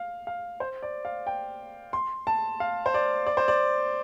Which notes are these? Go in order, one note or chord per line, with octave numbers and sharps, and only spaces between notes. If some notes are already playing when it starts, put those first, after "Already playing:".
Already playing: F5
F5
C5
D5
F5
G5
C6
A5
F5
C5
D5
D5
C5
D5